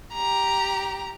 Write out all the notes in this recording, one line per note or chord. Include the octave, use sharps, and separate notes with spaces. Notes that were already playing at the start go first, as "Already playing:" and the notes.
G4 A#5